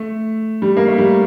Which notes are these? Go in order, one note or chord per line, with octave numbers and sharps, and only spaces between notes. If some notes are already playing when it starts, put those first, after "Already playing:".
Already playing: A3
G3
A#3
A3
G3